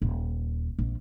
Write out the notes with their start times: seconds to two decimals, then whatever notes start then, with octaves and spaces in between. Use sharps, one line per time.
0.02 D#1
0.79 A#1